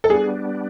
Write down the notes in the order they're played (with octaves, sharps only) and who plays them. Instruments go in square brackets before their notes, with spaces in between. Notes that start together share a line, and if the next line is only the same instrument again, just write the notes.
[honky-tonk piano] A4
[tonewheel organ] G3 B3 D4 [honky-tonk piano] G#4